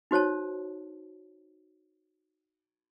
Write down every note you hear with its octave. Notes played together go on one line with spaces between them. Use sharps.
D#4 F#4 C5 C#5 A5